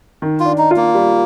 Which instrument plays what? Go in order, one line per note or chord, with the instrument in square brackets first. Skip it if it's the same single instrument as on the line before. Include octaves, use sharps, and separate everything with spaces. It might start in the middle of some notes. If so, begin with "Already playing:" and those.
[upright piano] D#3
[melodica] F4
[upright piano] D4
[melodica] D#4
[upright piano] F4
[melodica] A#3
[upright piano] G3